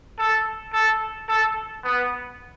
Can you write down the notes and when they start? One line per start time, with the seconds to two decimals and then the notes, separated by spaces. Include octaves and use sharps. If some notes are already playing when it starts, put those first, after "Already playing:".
0.18 A4
0.73 A4
1.29 A4
1.84 B3